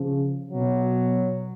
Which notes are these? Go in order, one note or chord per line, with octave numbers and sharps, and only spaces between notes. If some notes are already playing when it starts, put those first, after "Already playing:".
Already playing: C#3 F3
B2 F#3